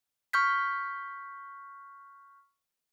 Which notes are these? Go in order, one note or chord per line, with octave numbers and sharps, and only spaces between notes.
C#6 F6 G6 B6